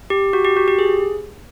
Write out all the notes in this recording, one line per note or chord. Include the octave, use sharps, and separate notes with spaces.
G4
F#4
G4
F#4
G4
G#4